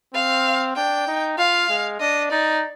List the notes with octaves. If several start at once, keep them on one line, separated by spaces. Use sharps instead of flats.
C4 F5
D4 G5
D#4
F4 F5
G#3
D4 D#5
D#4 D5